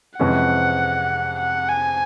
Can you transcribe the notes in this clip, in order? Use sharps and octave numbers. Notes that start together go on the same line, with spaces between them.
F2 C3 E3 G#3 C#4 F#5
F#5
G#5